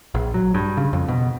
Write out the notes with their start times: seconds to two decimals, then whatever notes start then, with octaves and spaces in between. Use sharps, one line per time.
0.14 A#1
0.34 F#3
0.54 G2
0.77 C#3
0.93 F2
1.08 B2